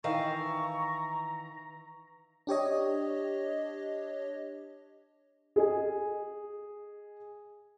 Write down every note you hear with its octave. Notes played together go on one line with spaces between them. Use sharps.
D#3 E3 F5 A#5 C#6
D4 G4 C#5 D#5
G#4 D#5 G#5